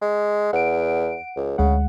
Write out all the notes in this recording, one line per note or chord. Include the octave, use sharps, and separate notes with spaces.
G#3
E2 F#5 D7
C#2
D2 C#3 G#3 F#5